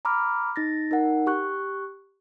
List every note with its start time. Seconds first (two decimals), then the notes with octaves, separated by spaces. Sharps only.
0.05 A#5 B5 D6 F6
0.56 D#4 A6 A#6
0.91 D#4 A#4 F#5
1.27 G4 C#6 F#6